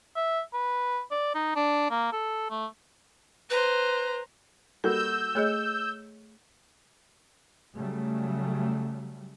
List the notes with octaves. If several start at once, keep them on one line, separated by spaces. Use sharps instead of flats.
E5
B4
D5
D#4
D4
A#3
A4
A3
B4 C5 A#5
G3 A#3 F#4 A4 E6 G6
A3 G#4 C#5 D#5
C#3 F#3 G3 A3